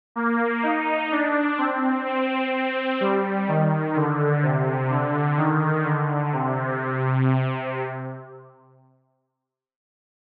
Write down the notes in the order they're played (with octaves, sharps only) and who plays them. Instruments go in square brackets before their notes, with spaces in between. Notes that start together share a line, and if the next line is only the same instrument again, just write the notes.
[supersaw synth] A#3
D#4
D4
C4
C4
C4
G3
D#3
D3
C3
D3
D#3
D3
C3